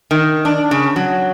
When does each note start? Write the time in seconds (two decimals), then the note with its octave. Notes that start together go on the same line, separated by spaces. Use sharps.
0.11 D#3
0.45 D4
0.71 C#3
0.96 F#3